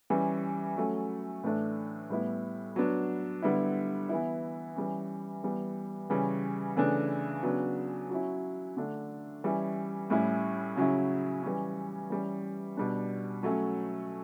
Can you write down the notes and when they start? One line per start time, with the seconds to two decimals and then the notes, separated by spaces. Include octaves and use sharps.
0.10 E3 G3 C#4
0.77 F#3 A3 C#4
1.44 A2 E3 A3 D4
2.10 A2 G3 B3 E4
2.76 F#3 B3 D4
3.43 D3 G3 B3 E4
4.09 E3 B3 E4
4.76 E3 G3 C#4
5.44 E3 G3 B3
6.10 C#3 E3 G3 C#4
6.77 C#3 E3 A3 D4
7.43 C#3 F#3 B3 D4
8.10 F#3 C#4 E4
8.77 D3 A3 D4
9.44 E3 G3 C#4 E4
10.10 A2 G3 C#4 E4
10.76 C#3 F#3 C#4 E4
11.43 E3 G3 C#4
12.10 E3 G3 C#4
12.77 B2 G3 D4
13.43 F#3 A3 C#4